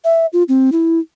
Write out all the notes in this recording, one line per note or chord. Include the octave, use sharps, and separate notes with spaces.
E5
F4
C4
E4